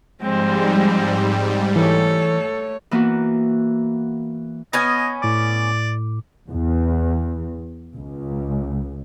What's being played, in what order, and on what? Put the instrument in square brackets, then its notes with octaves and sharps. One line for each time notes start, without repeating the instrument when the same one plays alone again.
[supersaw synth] G#2 G3 [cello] F3 G#3 [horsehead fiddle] C4 C5
[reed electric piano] E3 [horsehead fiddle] A3 C#5 [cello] A4
[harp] E3 A#3 B3 E4 F#4
[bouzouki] B3 C#4 G#5 [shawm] D#5
[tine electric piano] A2 D6 [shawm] D5
[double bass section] E2
C#2